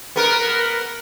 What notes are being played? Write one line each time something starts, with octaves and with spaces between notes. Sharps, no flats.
B3 A#4